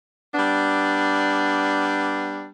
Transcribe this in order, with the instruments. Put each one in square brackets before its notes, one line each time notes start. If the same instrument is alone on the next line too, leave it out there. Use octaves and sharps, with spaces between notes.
[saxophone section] G3 B3 D4